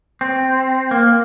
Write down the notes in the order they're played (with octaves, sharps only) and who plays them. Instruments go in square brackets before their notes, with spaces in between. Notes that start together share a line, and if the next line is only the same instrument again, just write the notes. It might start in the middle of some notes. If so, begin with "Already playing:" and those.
[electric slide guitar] C4
A#3